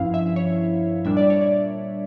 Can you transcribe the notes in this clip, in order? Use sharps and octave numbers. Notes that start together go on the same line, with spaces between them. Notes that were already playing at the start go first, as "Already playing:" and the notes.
Already playing: G2 F3 C#4 E4 F5
E5
C#5
A#2 G3 D4 E5
D5
C#5
D5